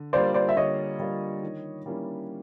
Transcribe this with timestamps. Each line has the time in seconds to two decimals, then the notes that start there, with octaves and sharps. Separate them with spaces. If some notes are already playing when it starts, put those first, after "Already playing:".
Already playing: D3
0.13 G3 A#3 D4 F4 C5 D5
0.34 C5 D5
0.49 E5
0.56 D3 C#5 D#5
0.99 G3 A#3 D4 F4
1.43 D#3
1.86 G3 A#3 C#4 E4